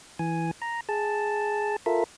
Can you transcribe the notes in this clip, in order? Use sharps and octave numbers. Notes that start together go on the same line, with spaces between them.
E3 G#5
A#5
G#4 A5
F4 A4 A#4 E5